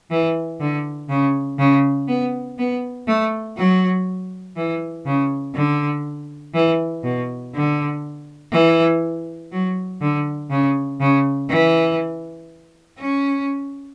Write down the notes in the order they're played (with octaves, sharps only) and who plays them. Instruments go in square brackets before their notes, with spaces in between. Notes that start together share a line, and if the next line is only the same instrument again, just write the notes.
[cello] E3
D3
C#3
C#3
B3
B3
A3
F#3
E3
C#3
D3
E3
B2
D3
E3
F#3
D3
C#3
C#3
E3
C#4